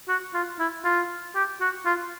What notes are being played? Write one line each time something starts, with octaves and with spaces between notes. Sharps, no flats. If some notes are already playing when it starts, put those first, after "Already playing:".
F#4
F4
E4
F4
G4
F#4
F4